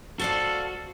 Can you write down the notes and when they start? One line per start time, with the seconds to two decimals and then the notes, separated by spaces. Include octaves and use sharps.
0.19 F#4 A4 C5 D5 F5 A5